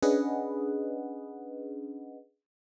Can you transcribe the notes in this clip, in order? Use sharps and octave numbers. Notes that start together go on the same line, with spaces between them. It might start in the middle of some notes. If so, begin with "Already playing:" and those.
C#4 D4 G#4 B4 D#5 F#5